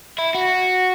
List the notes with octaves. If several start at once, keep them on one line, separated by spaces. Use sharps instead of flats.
E4
F#4